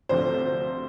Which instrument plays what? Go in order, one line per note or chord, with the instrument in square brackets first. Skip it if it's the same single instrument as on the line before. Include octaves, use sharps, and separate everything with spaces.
[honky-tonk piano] D2 C3 F3 A3 D4 [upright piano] C5